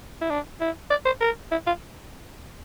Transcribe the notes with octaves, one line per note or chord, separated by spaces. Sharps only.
E4
D4
E4
D5
C5
A#4
E4
F4